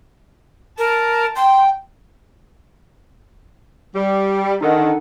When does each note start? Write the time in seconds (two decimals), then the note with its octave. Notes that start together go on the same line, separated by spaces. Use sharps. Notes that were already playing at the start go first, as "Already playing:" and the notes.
0.78 A#4 A5
1.36 G5 C6
3.95 G3
4.61 D3 D#3 D#4 A4 F#5